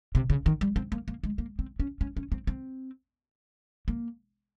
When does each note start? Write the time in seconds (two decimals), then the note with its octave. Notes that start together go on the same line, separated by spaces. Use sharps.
0.15 C3
0.30 C#3
0.46 D#3
0.61 G3
0.76 C4
0.92 A#3
1.08 A#3
1.24 G#3
1.38 A#3
1.59 C4
1.80 C#4
2.01 C#4
2.17 C#4
2.32 C4
2.47 C4
3.88 A#3